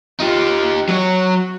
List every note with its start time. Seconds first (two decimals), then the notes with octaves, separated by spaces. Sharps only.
0.20 D#4 F4 G4
0.89 F#3 F#4 C#5